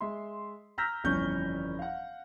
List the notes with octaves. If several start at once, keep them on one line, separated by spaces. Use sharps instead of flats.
G#3 E5 C6
A#5 E6 F6 G6 A#6 B6
G1 F2 E3 C#4 C#6 G6
F5 F#5